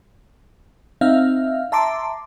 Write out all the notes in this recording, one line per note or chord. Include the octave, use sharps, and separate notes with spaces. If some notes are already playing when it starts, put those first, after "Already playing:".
C4 D#4 E5 F5 F6
E5 A5 A#5 C6 D6